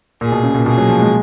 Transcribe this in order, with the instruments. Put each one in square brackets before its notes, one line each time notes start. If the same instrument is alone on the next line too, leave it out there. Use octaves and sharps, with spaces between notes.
[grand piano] A#2 [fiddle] G#4
[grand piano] B2
C#3
A#2
[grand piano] B2 [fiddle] G#4
[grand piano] F#3
F3
G#3